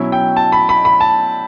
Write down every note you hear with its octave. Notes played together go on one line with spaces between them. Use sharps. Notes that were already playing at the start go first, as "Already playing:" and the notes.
Already playing: B2 F#3 C#4 E4
G5
A5
B5
B5
B5
A5